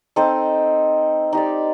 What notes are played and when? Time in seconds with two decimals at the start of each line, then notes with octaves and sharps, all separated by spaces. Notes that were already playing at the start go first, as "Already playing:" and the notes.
0.16 C4 D#4 A4
1.33 D#4 G4 D5